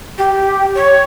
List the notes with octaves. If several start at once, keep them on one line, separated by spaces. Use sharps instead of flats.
G4
C#5